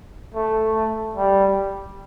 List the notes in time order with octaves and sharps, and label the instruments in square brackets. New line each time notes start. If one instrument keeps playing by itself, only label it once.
[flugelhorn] A3
G3